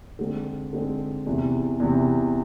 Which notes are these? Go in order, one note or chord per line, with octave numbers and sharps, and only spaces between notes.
D3 G#3 C4
D3 G#3 C4
E2 C3 E3
E2 C3 E3